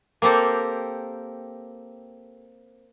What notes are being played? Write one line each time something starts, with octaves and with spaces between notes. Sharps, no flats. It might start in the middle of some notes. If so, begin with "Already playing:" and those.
A#3 C4 G4 A4 A#4